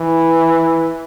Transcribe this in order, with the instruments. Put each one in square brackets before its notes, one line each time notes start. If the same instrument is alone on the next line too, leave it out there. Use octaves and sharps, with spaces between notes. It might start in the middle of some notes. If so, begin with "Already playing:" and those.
Already playing: [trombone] E3